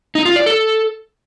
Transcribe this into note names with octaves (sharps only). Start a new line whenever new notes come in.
D#4
F4
D5
A4